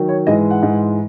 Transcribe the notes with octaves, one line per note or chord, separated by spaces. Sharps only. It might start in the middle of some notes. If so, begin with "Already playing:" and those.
Already playing: D#3 F#3
C#5
G#2 E3 G#3 D#5
F#5
G#2 E3 G#3